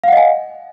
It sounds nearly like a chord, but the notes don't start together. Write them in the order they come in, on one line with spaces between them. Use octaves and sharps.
F5 F#5 D#5 G#5